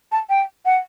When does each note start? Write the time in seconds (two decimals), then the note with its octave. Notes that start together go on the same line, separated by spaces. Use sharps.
0.12 A5
0.29 G5
0.65 F#5